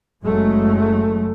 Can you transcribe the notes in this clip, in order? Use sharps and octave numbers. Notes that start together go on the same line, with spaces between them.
F#1 F#3 G#3 A3